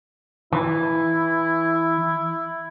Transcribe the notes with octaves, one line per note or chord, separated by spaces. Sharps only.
E3 E4